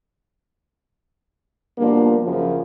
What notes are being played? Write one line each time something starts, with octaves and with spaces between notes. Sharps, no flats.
B2 F3 G3 A#3 D4
F#2 C#3 F3